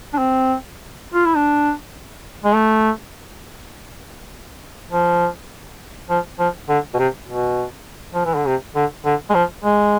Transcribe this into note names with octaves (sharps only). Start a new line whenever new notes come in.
D4
C4
F4
E4
D4
G#3
A3
F3
F3
F3
D3
B2
C3
B2
F3
E3
D3
C3
D3
D3
G#3
F3
G#3